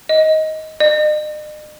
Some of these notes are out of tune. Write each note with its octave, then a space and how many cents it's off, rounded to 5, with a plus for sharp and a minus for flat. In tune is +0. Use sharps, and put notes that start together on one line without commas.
D#5 +15
D#5 -45